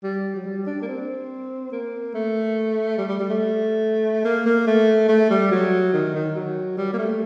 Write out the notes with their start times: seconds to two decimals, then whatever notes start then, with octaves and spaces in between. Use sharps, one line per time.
0.03 G3
0.36 F#3
0.46 G3
0.67 D4
0.82 A#3
0.88 C4
1.72 A#3
2.14 A3
2.98 G3
3.09 G3
3.19 G3
3.30 A3
4.25 A#3
4.46 A#3
4.67 A3
5.09 A3
5.30 G3
5.51 F#3
5.93 D#3
6.14 D#3
6.36 F#3
6.78 G3
6.93 A#3
6.99 A3